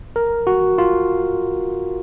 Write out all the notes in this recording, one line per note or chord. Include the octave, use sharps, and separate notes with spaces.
A#4
F#4
F4